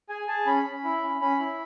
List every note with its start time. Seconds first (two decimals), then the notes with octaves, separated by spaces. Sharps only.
0.09 G#4 G#5
0.28 G#4 A5
0.47 C#4 B5
0.65 C#4
0.84 E4
1.03 C#4
1.21 C#4 B5
1.40 E4